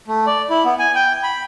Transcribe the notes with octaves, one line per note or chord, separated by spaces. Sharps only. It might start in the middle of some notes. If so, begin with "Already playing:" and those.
A3
D5
E4
B3
G#5
G5
B5